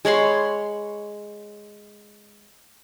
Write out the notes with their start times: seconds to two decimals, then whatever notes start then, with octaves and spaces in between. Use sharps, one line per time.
0.05 G#3 C#5 B5 C6